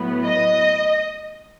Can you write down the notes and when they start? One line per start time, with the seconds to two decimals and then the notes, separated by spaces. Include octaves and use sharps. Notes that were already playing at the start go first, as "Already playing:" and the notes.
Already playing: A2 F#3 B3
0.24 D#5